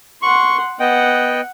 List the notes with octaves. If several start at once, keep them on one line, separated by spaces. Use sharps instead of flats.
F#5 C6 C#6
B3 D#5 F#5 G5